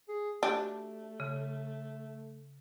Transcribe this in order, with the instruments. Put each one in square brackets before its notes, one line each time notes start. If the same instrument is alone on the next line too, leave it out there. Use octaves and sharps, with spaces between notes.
[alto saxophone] G#4
[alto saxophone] A3 [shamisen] D4 [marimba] F#4 G4
[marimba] C#3